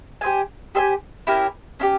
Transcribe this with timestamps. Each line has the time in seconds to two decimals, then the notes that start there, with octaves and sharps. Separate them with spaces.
0.21 G4 C5 E5 G#5
0.75 G4 C5 E5 G#5
1.27 C#4 E4 G4 A#4
1.80 C#4 E4 G4